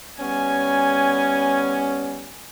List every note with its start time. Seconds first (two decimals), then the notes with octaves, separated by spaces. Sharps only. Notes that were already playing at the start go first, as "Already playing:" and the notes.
0.21 G3 B3 C#4 G#5